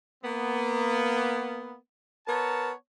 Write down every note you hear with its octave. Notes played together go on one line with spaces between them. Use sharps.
A#3 B3
B3 A#4 C#5 A5